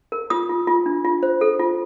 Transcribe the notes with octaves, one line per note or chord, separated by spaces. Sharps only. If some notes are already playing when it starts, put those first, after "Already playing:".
A#4
F4 D#6
F4
F4
D4
F4
C5
A4
F4